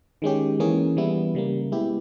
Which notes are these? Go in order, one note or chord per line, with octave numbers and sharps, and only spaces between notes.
D#3 G#3 C#4 G4
E3 A#3 C#4 G#4
E3 G3 B3 E4
C#3 G3 A#3
G#3 B3 E4 G4